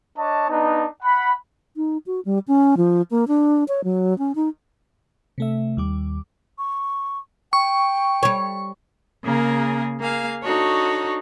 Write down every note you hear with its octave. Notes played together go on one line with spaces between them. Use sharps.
D4 C#5 D#5 A5
B3 D4 D#4
F#5 B5
D#4
F#4
G3
C#4
F3
A#3
D4
C#5
F#3
C#4
D#4
C3 A3 E5
D#2 G3 D6
C#6
G5 C#6
G3 C#5
C#3 A#3 G#4 A#4
A#3 G#4 F5
D4 D#4 F#4 A4 C#5